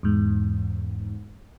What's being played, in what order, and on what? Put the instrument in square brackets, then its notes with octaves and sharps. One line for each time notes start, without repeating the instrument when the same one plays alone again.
[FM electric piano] E2 G#2